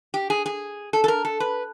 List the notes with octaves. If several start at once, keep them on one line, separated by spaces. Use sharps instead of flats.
G4
G#4
G#4
A4
A4
A#4
A4
B4